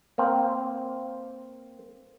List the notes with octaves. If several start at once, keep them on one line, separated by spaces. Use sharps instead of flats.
A#3 C4